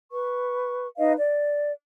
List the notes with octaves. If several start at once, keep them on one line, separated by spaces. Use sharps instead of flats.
B4 C#6
D#4 B4 D#5 F5
D5